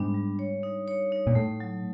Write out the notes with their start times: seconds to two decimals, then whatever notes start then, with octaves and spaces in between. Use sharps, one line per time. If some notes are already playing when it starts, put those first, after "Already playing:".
Already playing: G#2 G3 B3 D4
0.14 G3
0.39 C#5
0.63 D#4
0.88 C#5
1.12 D#4
1.27 A#2
1.35 A2 A3
1.60 F#3